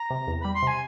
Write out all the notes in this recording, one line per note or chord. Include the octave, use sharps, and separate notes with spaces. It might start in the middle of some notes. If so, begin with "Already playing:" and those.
Already playing: A#5
C3
E2
G3 B5
C6
C3 G#5